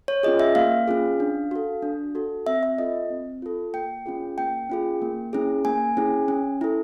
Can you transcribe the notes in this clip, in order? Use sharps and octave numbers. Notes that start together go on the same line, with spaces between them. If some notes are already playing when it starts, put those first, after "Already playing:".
C#5
C#4 F4 G#4 D#5
E5
A#3 F5
C#4 F4 G#4
D4
F#4 A4
D4
F#4 A4
C4 E5
E5
F4 A4 D#5
C4
F4 A4
A#3 G5
C#4 F4 G#4
A#3 G5
C#4 F4 G#4
A#3
C#4 E4 G#4
A#3 G#5
C#4 E4 G#4
C#4
E4 A4